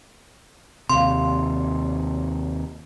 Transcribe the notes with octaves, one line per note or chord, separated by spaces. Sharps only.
D#2 C3 F4 G4 F5 C6